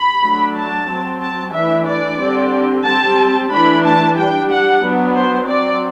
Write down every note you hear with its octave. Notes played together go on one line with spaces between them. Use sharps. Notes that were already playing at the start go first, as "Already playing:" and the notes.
Already playing: B5
F#3 A3 D4
A5
F#3 C4
A5
E3 A3 D4 E5
D5
D3 G3 C4
G3 C4 A5
E3 A3 D4 B5
A5
G3 D4 G5
F#5
F#3 B3 D4
C5
F#3 C4 D5